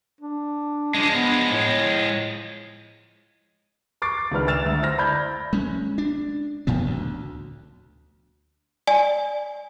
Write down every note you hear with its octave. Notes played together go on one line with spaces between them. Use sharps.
D4
F3 G#3 D4
B3
A2
C#6 D6 A6 C7 D7
C#2 D#3 D4 B4 F6
E6 F6 A6 E7 F7
D2
E4 C5 F6 A#6
D5 B5 G6 G#6
G#3 C#4
D4
A2 F3 B3
D2
D5 G#5